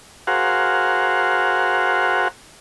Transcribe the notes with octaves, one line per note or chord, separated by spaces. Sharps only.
F#4 G#4 A#4 C5 F5 F#5